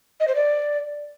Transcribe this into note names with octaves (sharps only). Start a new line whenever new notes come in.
D#5
C5
D5